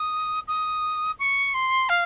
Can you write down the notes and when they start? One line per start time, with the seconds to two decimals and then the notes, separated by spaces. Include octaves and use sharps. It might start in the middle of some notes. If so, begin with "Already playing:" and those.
Already playing: D#6
0.47 D#6
1.19 C#6
1.54 C6
1.89 F5